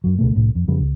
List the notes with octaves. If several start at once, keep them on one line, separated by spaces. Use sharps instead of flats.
F#2 F#3
C#2 B2 A3
C2 A2
F2
F2 C#3 G3
C#2